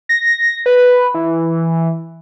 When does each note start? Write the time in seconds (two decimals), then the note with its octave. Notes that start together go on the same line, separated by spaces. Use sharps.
0.09 A#6
0.66 B4
1.14 E3